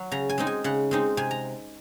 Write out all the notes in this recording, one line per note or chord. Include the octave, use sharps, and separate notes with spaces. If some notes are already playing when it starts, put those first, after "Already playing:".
Already playing: F#3
C#3 A#5
G#5
G#3 C4 D#4
G#5
C#3 F#5
G#3 C4 D#4
C3 G#5
A#5